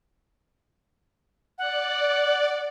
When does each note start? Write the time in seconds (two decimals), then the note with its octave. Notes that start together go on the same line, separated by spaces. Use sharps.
1.58 D5 F#5